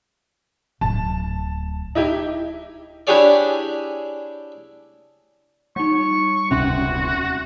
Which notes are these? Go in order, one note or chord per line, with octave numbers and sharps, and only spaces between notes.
D1 A5
D#4 E4 G4
D4 E4 G4 G#4 C#5 D5
G3 D#4 C#6
D#1 C#2 C3 C#4 F#4 E5 C6